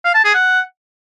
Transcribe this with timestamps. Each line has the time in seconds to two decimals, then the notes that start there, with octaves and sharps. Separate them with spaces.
0.05 F5
0.15 A5
0.25 G#4
0.35 F#5